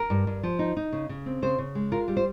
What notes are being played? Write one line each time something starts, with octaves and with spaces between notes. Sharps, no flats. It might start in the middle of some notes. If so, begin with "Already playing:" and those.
Already playing: A#4
G2
G2
F3
D#4
D#4
C#3
C#3
C4
C#3 C5
C#3
G#3
F4 A#4
G3
C5